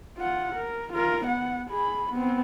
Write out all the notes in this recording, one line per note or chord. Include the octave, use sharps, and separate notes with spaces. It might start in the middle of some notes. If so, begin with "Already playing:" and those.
F4 F#5
A#4
F4 A#4
B3 F#5
G#4 B5
B3 C4